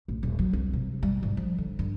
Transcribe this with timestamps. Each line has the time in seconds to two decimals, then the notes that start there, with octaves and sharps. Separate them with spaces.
0.08 A1
0.23 D#1
0.39 F#3
0.53 C2
0.73 C3
1.03 G3
1.23 G#2
1.37 F3
1.58 D3
1.79 G2